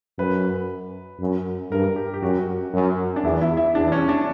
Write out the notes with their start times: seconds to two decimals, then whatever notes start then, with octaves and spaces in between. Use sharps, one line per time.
0.18 F#2 B4
1.20 F#2
1.71 G2 A#4
1.96 G4
2.14 G4
2.22 F#2 F#4
2.73 F#2
3.16 D4
3.24 E2 E4
3.41 E4
3.57 E4
3.75 E2 D4
3.92 C#4
4.09 D4